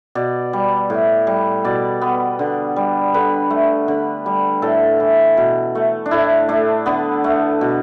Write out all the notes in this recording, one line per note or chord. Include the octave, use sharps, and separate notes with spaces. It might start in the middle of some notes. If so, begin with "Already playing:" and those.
B2 D5
G3
A2
G3
B2 D5
B3
D3
G3
D3 B4
A3
D3
G3
A2 A4
E3
B2
A3
D4
A2 E4
A3 D4
D3 B3
A3
B2